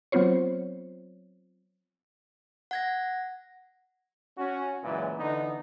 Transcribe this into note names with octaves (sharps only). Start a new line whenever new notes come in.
F#3 B3 C4 F4 C5 C#5
F#5 G#6 A#6
C#4 F#4
C#2 F#2 A#2 E3
D3 E3 B3 D#4